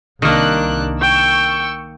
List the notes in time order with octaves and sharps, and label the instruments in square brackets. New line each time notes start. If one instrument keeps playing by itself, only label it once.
[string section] C2 D4 F#6 [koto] D#3 A#3
[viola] G5 [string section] C#6 E6